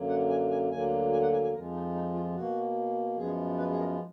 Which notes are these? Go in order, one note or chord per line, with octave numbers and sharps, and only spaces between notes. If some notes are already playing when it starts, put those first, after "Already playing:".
Already playing: F#2 D3 F#3 A#3
F#5
G#5
G#5
D2 D3 F#3 A#3 G#5
G#5
F#5
G#5
G#5
F2 F3 G#3 A#4
D#4
D#4
F4
B2 A#3 F#4
F#2 F3 G#3 B3 G#4
B4
G#4
A#4